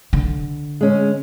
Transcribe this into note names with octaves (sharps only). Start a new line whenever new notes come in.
D3
G#3 C#4